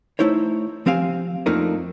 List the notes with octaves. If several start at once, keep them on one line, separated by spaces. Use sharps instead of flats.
A3 D#4 E4 C5 C#5
F3 C4 G4 F5 G#5
F2 F3 A3 A#3 D4 D#4